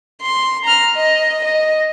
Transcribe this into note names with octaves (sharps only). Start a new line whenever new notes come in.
C6
A#5 F6
D#5
D#5